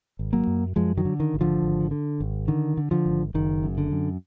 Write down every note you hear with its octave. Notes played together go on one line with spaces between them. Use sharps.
G#1
F#3 A#3
F#2
F#2 F3 G#3
D#3 F#3
D3
D#3
G#1
D3 F3
G#1
D3
G#1
D3 D#3
D3
D3 F3
G#1
F#1 D#3
F#2
D3
F#2